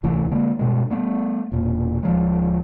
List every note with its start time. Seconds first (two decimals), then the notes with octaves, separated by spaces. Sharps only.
0.03 D1 C2 E3 A3
0.31 D3 G#3 A#3
0.59 G2 B2 G#3
0.90 G3 A3 B3
1.52 E1 A#2
2.03 D1 F3 G#3